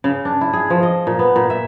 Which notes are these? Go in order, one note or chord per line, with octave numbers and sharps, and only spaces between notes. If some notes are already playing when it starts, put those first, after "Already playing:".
C#3
D4
E4
G#4
F3
D#5
A#2
B3
A#2
E5